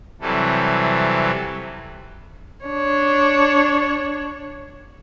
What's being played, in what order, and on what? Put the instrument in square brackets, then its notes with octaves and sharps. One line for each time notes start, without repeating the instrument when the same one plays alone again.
[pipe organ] C3 E3 F#3 G3 A4
[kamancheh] D4 C#5